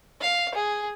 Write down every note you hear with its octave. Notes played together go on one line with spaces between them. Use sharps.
F5
G#4